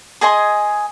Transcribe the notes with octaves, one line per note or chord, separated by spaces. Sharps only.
G#4 D#5 G#5 C6